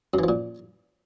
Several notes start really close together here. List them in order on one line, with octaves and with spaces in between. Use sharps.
F#2 E3 F3 A#2